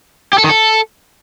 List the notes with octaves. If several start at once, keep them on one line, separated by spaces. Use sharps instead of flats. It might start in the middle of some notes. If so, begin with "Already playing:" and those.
G4
A4
D#3
A4